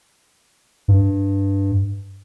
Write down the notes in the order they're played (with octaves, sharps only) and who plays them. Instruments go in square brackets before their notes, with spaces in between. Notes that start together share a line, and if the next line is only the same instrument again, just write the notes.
[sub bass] G2